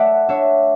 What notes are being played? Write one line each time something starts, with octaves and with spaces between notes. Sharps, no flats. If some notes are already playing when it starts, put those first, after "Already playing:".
Already playing: A3 D5 E5 F#5
D4 C#5 E5